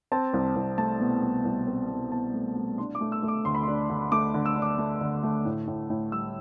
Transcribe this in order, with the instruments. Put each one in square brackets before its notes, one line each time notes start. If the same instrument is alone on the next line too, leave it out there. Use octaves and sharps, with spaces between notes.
[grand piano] C4 A5
C2
C2
A3 A5
B2
C2
C2
C4
B2
B2 A5
A3
A3
D4 C6
D6
A3
E6
A3
D6
D2 C6
B5
D4 C6
D3
A3 D6
D3
E6
D4
D6
A3
D3
A3
A2
A2
A2
G3 E6